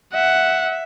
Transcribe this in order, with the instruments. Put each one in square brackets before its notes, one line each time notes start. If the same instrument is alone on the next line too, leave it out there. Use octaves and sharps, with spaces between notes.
[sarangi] E5 [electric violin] F#5